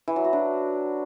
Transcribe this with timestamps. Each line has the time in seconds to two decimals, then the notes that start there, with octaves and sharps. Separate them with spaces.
0.08 E3
0.16 F#3
0.24 F#4
0.33 D4